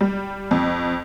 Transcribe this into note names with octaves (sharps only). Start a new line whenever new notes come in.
G3
F2